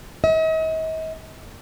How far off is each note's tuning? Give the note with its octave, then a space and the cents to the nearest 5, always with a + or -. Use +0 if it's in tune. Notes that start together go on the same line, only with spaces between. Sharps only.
D#5 +45